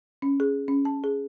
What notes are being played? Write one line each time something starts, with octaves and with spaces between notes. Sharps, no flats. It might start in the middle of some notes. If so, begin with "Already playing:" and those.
C#4
G#4
C#4
A5
G#4